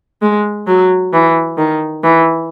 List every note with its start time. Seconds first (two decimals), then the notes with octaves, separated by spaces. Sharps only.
0.22 G#3
0.67 F#3
1.13 E3
1.58 D#3
2.04 E3